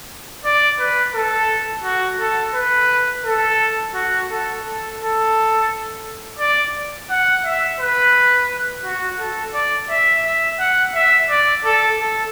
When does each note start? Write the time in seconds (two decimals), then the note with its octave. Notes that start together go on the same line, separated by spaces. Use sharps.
0.45 D5
0.80 B4
1.15 A4
1.84 F#4
2.20 A4
2.54 B4
3.25 A4
3.94 F#4
4.30 A4
4.65 A4
5.00 A4
6.39 D5
7.10 F#5
7.45 E5
7.80 B4
8.84 F#4
9.20 A4
9.54 D5
9.90 E5
10.25 E5
10.60 F#5
10.95 E5
11.30 D5
11.65 A4
12.00 A4